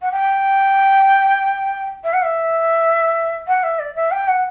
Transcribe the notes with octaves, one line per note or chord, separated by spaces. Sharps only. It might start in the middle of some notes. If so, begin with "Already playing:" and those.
F#5
G5
E5
F#5
E5
F#5
E5
D5
E5
G5
F#5